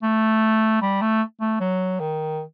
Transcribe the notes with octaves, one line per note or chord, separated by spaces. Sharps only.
A3
G3
A3
A3
F#3
D#3